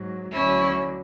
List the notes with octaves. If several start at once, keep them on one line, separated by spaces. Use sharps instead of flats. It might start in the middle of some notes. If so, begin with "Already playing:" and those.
Already playing: G#2 F#3
D2 D3 F#3 C#4 E4